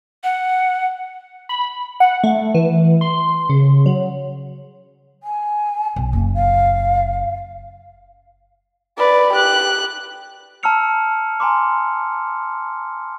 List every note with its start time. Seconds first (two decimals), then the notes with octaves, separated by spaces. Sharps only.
0.24 F#5
1.49 B5
2.00 F#5
2.24 A3
2.54 E3
3.01 C6
3.49 C#3
3.86 F#3
5.23 G#5
5.96 B1
6.13 F#1 A#3
6.34 F5
8.98 B4 D5
9.33 G4 F#6
10.63 A5 A#5 E6 F6 C#7 F7
11.40 G#5 A#5 C6 D6